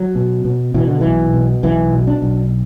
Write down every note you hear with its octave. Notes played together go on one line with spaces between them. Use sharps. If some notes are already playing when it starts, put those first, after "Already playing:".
Already playing: F#3
B2
B2
B2 E3
D3
B1 E3
B2
B1 E3
B2
D4
B1